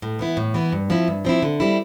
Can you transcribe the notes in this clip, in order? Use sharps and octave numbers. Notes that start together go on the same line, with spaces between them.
A2
E3 B3 E4
A2
E3 B3 E4
G2
F3 C4 E4
G2
F3 C4 E4
D3
G3 C4 E4